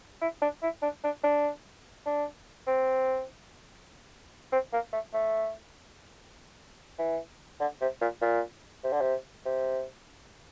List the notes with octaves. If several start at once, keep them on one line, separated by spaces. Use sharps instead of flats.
E4
D4
E4
D4
D4
D4
D4
C4
C4
A#3
A3
A3
E3
D3
C3
A#2
A#2
C3
D3
C3
C3